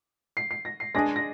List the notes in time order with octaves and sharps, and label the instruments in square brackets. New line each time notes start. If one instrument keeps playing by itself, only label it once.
[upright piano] C7
C7
A#6
C7
[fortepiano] G#3 D4 G#4 [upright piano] A#6
[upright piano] A#6